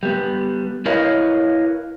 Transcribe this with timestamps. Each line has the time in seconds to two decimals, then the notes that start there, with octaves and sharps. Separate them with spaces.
0.03 G3 B3
0.86 E4 A#4 B4 C#5 D#5 F5